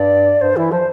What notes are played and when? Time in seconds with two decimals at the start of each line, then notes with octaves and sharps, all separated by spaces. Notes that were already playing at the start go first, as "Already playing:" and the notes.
Already playing: G2 D5
0.41 G2 C5
0.56 E3 E4
0.72 F3 C5